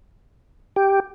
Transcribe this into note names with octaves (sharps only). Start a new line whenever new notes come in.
G4